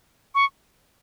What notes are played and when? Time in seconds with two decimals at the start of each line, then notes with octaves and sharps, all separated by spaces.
0.35 C#6